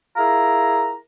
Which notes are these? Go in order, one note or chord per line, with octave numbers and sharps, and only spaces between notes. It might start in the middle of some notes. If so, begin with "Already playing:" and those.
E4 F4 G#4 A#4 A#5